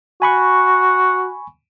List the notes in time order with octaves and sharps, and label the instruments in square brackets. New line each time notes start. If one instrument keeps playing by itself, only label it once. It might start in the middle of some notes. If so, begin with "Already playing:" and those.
[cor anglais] F#4 [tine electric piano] G#5 B5 C#6